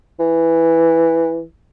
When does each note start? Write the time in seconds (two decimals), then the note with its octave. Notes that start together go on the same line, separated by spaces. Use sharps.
0.20 E3